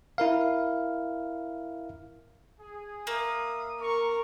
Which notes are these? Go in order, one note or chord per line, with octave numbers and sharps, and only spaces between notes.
E4 A#4 F5
G#4
A#3 E5 F5 D#6
A#4 C#6